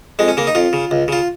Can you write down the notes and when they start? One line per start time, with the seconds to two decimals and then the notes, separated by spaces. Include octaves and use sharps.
0.19 F2 G#3
0.28 C#4
0.37 C#3 A#3
0.47 D#4
0.55 F2 F4
0.73 C#3
0.91 C#2
1.08 C#3 F4